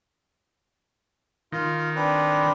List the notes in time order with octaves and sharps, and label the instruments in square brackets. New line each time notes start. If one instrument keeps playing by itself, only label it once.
[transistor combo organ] D#3 [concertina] F4
[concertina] C4 D4 B4